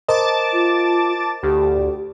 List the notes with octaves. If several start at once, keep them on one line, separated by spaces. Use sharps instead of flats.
A#4 C5 D#5 A5 D6 A6
F4
D2 G4